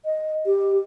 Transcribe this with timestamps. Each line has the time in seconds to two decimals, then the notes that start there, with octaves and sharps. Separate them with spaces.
0.05 D#5
0.46 G4